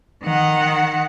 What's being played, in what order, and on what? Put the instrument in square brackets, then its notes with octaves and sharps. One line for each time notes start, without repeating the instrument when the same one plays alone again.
[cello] D#3 F#5